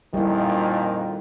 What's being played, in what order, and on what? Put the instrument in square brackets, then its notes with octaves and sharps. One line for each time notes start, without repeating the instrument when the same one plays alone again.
[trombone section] F2 A#2 D#3 [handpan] G3 E4